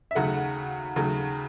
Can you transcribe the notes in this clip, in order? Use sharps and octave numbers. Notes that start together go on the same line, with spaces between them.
E5
D#2 C#3 F#3 A3 F#5
D#2 C#3 F#3 A3